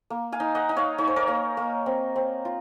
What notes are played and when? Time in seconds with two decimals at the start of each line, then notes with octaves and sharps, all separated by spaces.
0.10 A#3
0.32 F5 G#5
0.40 D#4
0.55 D#5 F#5
0.69 D#4
0.77 C#5 F5
0.98 D#4 C#5
1.07 C5
1.16 A#4 C#5
1.28 A#3
1.57 A#3
1.86 C4
2.16 C4
2.45 F4